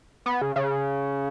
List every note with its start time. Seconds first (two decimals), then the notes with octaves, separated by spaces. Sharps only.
0.26 B3
0.41 C#3
0.56 C#3